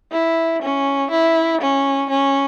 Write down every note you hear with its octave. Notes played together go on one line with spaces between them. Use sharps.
E4
C#4
E4
C#4
C#4